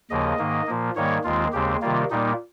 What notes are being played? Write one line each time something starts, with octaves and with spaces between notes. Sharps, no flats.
D#2 C#3 F3 A#3 D#5
G#2 D#3 A#3
A#2 F3 A#3
G#2 D#3 G3 A#3 C#5
D#2 D#3 G#3 C4 F4
D#2 C#3 G#3 C4 G4
C3 D#3 G3 A#3 F4
A#2 G3 A#3 D#4